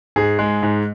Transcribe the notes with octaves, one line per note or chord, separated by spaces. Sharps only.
G#2 G#4
G#3
G#2